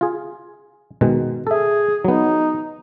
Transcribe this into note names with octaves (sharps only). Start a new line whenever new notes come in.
F4 G#4
B2 D#3 G#3
G#4 A4 E5
F#3 B3 D#4